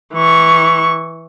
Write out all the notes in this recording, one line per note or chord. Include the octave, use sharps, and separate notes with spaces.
E3 C#6